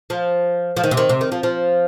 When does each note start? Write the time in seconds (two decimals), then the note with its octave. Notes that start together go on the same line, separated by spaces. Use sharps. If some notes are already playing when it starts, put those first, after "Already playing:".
0.10 F3
0.77 F3
0.84 D#3
0.91 C3
0.97 D#3
1.09 C3
1.21 D#3
1.32 F3
1.43 F3